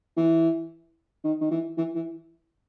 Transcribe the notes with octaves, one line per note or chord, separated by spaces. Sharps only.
E3
D#3
D#3
E3
E3
E3